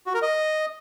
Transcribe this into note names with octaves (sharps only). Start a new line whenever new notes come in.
F#4
A#4
D#5